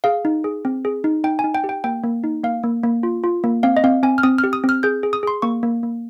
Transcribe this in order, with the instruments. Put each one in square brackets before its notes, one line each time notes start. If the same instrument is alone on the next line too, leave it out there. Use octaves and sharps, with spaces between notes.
[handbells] G#4 F5
D#4
G#4
C4
G#4
D#4
D#4 G5
G#5
D#4
G5
G4
G5
A#3 G5
A#3
D#4
A#3 F5
A#3
A#3
F4
F4
A#3
C4 F5
D#5
C4 F5
C4 G#5
F6
C4 D#6
F6
G4
D#6
C4
F6
G#4 G6
G#4
D#6
G#4 C6
A#3 C#6
A#3
A#3